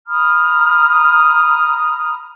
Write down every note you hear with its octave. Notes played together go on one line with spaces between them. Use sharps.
A#5 B5 D#6 F6